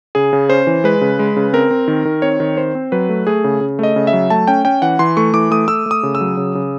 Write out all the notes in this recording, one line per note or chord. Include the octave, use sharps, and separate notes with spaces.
C#3 G#4
C#3
C#4 C5
E3
G#3 B4
C#3
G#3
C#3
C4 A#4
C4
D#3
D#3
C4 C#5
D#3
C4 C5
C4
F#3 B4
A3
A3 G#4
C#3
C#3
A3 D#5
C#3
E5
F#3
A3 A5
C#4 G5
C#4 G5
E3 F#5
E3 C6
A3 C#6
E3 D6
A3 D#6
A3 E6
A3
D#6
C#3
E6
F#3
C#3
C#3